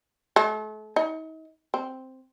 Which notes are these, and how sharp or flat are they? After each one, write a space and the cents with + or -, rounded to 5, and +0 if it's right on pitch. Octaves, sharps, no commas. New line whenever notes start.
A3 -40
D#4 +40
C4 +0